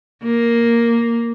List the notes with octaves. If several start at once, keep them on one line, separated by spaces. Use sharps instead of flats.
A#3